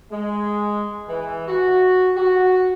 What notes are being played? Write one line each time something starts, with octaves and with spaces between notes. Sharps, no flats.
G#3
E3
F#4
F#4